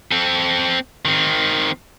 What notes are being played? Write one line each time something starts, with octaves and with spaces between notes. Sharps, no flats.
C4 A4
D#3 C4